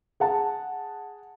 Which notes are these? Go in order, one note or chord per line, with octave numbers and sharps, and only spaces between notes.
G#4 F#5 A5